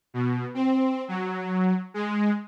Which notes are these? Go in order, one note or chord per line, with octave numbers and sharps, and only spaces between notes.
B2
C4
F#3
G#3